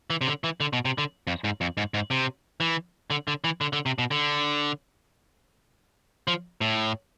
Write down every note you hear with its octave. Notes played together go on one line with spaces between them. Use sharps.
E3
C3
D3
E3
D3
B2
C3
D3
F2
G#2
F2
G#2
G#2
C3
E3
D3
D3
E3
D3
D3
C3
B2
D3
F3
A2